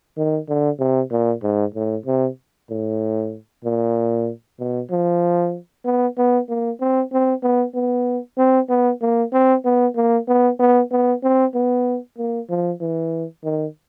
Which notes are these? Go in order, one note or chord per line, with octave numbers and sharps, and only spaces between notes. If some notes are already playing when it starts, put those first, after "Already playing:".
D#3
D3
C3
A#2
G#2
A2
C3
A2
A#2
B2
F3
B3
B3
A#3
C4
C4
B3
B3
C4
B3
A#3
C4
B3
A#3
B3
B3
B3
C4
B3
A#3
F3
E3
D#3